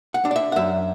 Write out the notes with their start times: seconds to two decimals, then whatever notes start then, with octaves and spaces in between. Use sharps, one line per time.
0.14 F#5
0.25 D4
0.31 D5
0.36 E5
0.52 F#5
0.56 F#2 E5